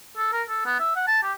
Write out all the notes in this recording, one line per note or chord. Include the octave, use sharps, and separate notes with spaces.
A4
A#4
A4
B3
E5
F#5
A5
G4